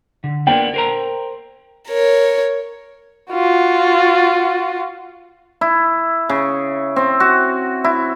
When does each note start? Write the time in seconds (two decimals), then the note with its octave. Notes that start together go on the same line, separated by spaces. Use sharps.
0.24 D3
0.47 A#3 B3 D4 G5
0.74 A#4 C5 A#5
1.88 A#4 C#5
3.31 F4 F#4
5.61 E4
6.29 C#3
6.96 C4
7.20 F#4
7.84 E4